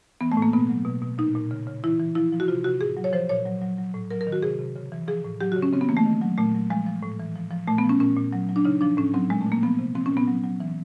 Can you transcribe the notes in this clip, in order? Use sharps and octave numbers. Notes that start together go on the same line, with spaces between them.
E3 B3
A3
A2
A#3
B2 B3
F#3
B2
B2
A#2 D#4
A#2
C#3
C#3
E3 E4
E3
F3 E4
F3
F#4
C3 F4
C3 F#4
A2 G#4
F#3
C#5
F3 C5
A#2 C#5
F#3
F#3
F#3
A2
F#3 A#4
A#4
D#3
F#4
C3 G#4
C3
C#3
E3
F3 G#4
A2
F#3 G4
F#4
C#3
C#4
C#3 C4
B3
E3 A#3
A3
D#3
F#3
A#2 A3
F#3
F3 G#3
F3
A2
E3
F3
F3
A#2 A3
B3
F3
C#4
A#2 C#4
A#2
F#3
F#3
D4
C#3 D#4
F3 D4
A2 C#4
F#3 C4
A#2 G#3
A3
A#2
A#3
F3 B3
C3
F3 C4
C#4
A#2
B3
F#3
F#3
E3